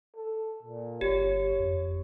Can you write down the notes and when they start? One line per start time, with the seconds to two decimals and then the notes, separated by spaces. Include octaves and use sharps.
0.15 A4
0.62 A#2
1.01 G1 G4 C#5
1.59 F2